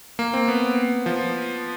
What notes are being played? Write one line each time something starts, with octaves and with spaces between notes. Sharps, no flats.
A#3
C4
B3
F3